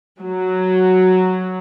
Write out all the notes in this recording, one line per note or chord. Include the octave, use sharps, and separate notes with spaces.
F#3